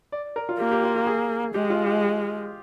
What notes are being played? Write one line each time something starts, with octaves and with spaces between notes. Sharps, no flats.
D5
A#4
F4
A#3 G4
G4
F4
G4
G#4
G#3 G4
F4
G4